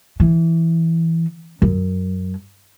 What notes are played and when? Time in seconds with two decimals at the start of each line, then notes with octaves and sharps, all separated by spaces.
0.20 E3
1.62 F#2